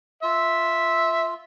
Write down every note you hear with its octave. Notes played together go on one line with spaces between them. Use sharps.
F4 E5